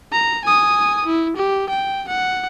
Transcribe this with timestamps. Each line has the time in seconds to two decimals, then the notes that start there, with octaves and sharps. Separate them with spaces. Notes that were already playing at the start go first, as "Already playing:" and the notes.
0.12 A#5
0.45 G#5 D#6
1.06 E4
1.37 G4
1.70 G5
2.08 F#5